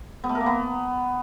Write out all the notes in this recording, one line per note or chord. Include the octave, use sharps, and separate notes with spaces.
B3
A3
A#4
A#3
B3